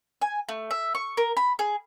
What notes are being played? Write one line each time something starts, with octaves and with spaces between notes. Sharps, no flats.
G#5
A3
E5
C#6
A#4
B5
G#4